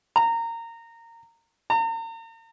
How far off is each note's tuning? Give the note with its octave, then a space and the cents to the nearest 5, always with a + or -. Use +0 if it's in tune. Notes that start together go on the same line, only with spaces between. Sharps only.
A#5 -20
A#5 -40